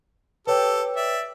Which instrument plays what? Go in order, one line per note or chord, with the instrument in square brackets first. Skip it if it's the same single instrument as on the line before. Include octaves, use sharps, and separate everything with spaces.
[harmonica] G4 A4 [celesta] B4 C#5 G5
[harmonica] D5 E5